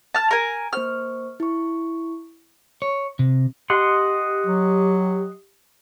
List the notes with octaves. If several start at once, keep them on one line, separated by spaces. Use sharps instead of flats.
A5 F6
A#4 G#5
A#3 C5 C#6 F6
E4 C#6
C#5
C3
G4 D#5 F#5 C6
F#3